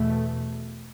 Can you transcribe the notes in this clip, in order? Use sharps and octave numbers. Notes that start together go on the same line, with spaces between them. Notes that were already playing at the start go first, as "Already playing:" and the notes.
Already playing: E2 B2 A3